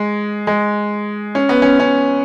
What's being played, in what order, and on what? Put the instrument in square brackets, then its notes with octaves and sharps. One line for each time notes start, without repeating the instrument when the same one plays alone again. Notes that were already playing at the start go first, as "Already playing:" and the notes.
Already playing: [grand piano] G#3
G#3
C#4
B3
C#4
C#4